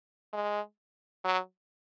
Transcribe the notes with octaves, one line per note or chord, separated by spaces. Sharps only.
G#3
F#3